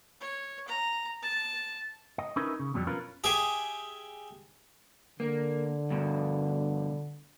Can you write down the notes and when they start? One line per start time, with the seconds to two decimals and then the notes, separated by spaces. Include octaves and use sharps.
0.21 C#5
0.68 A#5
1.22 A5
2.18 D#5
2.36 C#4 D#4 E4 A#4 B4
2.59 C#3
2.74 F2 B2 F#3 G3
2.87 C#4 F4 A#4 B4
3.24 G4 G#4 E5
5.20 D3 A#3
5.91 G2 B2